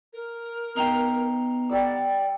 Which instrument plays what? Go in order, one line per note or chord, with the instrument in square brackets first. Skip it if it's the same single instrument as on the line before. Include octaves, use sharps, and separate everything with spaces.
[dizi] A#4
[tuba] B3 [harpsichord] D#4 F5 G5
[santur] G3 F#5 E6 [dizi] D5